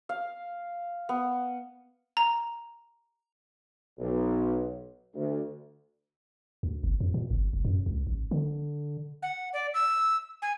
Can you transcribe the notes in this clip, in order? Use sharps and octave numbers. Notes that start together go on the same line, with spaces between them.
F5
B3
A#5
B1
D2
D2
G1
F2
A#2
G1
F1
F#2
C#2
A1
D3
F#5
D5
E6
G#5